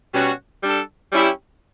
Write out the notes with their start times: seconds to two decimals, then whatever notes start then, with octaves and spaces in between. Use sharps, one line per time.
0.14 B2 G3 C#4 F#4
0.64 G3 D4 A4
1.12 G3 C#4 E4 G4